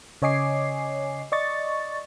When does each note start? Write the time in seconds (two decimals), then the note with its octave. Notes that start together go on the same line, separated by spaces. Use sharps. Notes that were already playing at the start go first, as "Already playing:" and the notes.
0.22 C#3 C#5 D#5 G#5 D6 C7
1.32 D5 D#5 C#6 A6